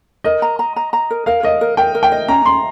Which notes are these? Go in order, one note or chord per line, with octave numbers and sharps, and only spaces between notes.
A#4 D#5
A#5
A#5
A#5
A#5
A#4
A#4 F5
A#4 D#5
A#4
A#4 G5
A#4
G5
D#5
C#4 A#5
C#4 C6